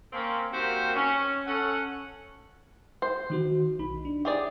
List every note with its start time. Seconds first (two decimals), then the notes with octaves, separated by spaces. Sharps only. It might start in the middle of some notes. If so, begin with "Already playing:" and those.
0.13 A#3 C4 C#4
0.52 D#3 A#3 C4 F#4 G4 C5
0.95 C#4
1.46 C#4 A4 F#5
3.02 C5
3.30 D#3 D#4 F#4
3.79 B1 D#4 B5
4.05 D4
4.25 G4 G#4 D5 E5